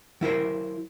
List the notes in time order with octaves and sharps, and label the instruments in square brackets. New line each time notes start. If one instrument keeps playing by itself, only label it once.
[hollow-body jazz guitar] F#3 E4 A#4 C5